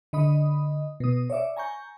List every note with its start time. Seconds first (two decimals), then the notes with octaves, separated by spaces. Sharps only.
0.13 D3 D#5 B5 D#6
1.00 B2 D#6
1.30 C#5 D5 E5 D6
1.57 G#5 A#5 C#6 G6